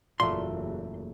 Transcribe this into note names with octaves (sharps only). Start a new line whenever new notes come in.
F#1 E2 A#2 A3 C6